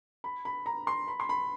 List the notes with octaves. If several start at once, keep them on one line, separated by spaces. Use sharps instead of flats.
B5
B5
A#5
C6
B5
C6
B5